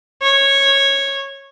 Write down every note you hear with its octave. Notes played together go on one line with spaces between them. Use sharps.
C#5